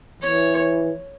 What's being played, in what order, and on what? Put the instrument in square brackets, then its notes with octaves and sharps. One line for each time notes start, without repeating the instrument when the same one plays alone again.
[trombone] E3 [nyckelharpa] C#5